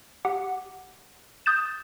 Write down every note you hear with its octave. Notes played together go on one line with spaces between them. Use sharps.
G4 F#5
D#6 G6 A6 E7